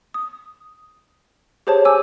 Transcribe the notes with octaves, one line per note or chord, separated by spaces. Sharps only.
D#6
G4 G#4 C5 C#5 A5
G#5 D6 E6